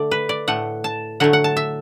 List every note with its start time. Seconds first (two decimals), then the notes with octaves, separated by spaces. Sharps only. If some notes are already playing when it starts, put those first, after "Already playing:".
Already playing: D3 A3 D5
0.11 B4
0.29 D5
0.48 A2 A3 F#5
0.84 A5
1.20 D3 F#3 A3 F#5
1.33 F#5
1.44 A5
1.57 E5